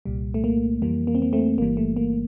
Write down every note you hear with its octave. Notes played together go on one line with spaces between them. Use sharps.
C2 A#2 G3
A3
A#3
F2 E3 G3 A#3
A#3
C4
A#3
A3 C4
G1 G2 E3 G3 A#3
A3
A#3